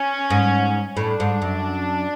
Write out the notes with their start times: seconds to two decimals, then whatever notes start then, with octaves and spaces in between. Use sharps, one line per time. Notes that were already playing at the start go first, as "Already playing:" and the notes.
Already playing: C#4
0.30 G#2
0.97 A2 D4
1.20 G#2
1.42 F#2